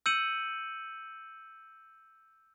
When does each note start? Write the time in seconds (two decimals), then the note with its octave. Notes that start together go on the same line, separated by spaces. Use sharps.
0.06 E6 G6 C#7 D#7 F#7